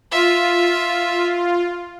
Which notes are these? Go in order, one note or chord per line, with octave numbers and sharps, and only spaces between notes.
F4 E5